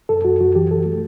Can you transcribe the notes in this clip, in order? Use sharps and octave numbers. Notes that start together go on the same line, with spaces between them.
F#2 A4
F#2 F#4
F#2 F#4
E3 G4
F#2 A4
A3